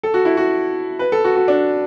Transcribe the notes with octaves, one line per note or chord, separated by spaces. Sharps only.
A4
F#4
E4
F#4
B4
A4
F#4
F#4
D4